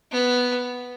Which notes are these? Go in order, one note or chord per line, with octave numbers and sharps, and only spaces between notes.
B3